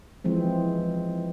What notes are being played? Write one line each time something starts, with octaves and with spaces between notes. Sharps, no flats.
E3 F3 G#3 C4